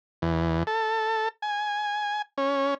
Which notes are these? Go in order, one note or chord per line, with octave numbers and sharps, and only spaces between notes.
E2
A4
G#5
C#4